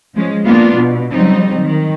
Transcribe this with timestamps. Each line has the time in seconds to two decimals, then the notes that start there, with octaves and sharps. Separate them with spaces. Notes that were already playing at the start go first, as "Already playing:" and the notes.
0.15 F3 G#3 C#4
0.45 A#3 B3 D4 F4
0.76 B2
1.12 C#3 F#3 G3 C4 D#4
1.61 D#3